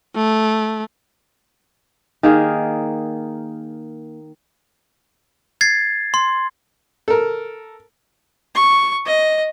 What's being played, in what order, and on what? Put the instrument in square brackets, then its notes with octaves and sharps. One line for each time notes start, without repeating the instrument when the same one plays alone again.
[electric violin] A3
[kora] D#3 A#3 G#4
[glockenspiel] G#6 A6 C7
C6
[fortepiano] A4 A#4
[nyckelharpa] C#6
D#5